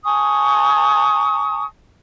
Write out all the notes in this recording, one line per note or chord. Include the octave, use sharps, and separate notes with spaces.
G#5 A5 C#6 D#6